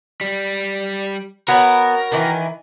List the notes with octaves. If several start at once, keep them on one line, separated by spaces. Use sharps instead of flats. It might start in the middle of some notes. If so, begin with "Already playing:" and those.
G3
B3 F#4 A#4 C#5 B5
D#3 E3